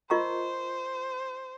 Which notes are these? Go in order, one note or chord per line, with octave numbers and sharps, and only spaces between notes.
F4 A#4 C5 D#5 A#5 C#6